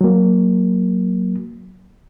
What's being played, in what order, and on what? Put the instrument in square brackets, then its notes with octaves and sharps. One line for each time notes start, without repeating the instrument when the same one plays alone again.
[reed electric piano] F#3 A#3